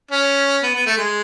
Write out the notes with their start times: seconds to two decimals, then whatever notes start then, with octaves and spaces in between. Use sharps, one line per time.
0.11 C#4
0.63 B3
0.75 B3
0.86 A3
0.98 G#3